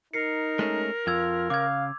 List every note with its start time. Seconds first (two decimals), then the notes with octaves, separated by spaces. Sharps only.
0.14 D#4 A#4 C7 C#7
0.59 G#3 A3 C#4
1.07 F2 F4 E6 G#6 F7
1.50 C#3 F5 D6 G#6